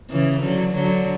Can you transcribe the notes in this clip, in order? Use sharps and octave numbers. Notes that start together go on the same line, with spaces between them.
C#3 E3
D3 F#3
D3 F#3